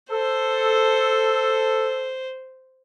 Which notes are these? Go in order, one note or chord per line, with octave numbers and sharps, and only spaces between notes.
A4 C5